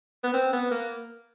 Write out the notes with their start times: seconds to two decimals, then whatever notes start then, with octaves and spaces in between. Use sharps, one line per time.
0.24 B3
0.33 C4
0.53 B3
0.71 A#3